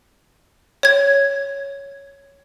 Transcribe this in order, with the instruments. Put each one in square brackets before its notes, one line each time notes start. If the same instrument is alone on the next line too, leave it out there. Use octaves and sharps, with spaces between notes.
[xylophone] C#5 G#6